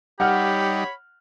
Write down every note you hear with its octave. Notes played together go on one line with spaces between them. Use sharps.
G3 D#4 G4 C#5 F#5 B5 F6